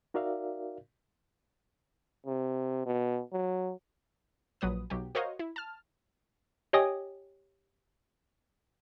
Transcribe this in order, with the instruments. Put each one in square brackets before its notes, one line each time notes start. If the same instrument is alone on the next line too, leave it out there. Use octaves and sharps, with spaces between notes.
[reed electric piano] D#4 F#4 A#4 D5 E5 F5
[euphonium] C3
B2
F#3
[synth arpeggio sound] A#1 F#3 B4 D#6
B1 F#3 G4
F#4 A#4 C5 C#5 D#5 F5
E4
A5 F6
[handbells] G4 C#5 D#5 G5 G#5 D#6